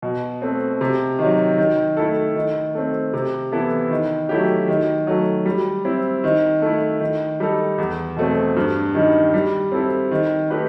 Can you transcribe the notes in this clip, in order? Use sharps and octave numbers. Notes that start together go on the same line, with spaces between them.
B2
A3 C4
C3
D#3 F#3
D#3
A3 E4 A4
D#3
A3 C4
C3
E3 B3 E4 A4
D#3
F#3 A3 E4 G4
D#3
F#3 A3
G3
C4 E4
D#3
A3 E4
D#3
G3 D#4 A4
E2
B2 A3 C4
G2
D#3 G3 D#4
G3
C4 E4 A4
D#3
A3 D#4 G4 B4